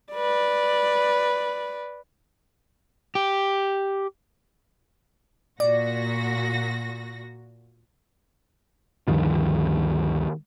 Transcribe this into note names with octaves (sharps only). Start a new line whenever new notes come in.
B4 D5
G4
A#2 F#4 D5 A#6
D2 G2 D#3 F3